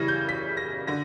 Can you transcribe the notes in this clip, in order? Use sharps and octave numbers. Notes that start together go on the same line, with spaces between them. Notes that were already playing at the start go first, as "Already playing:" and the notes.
Already playing: C#3 E3 G3 A#6
G6
B6
A#6
D3 A#6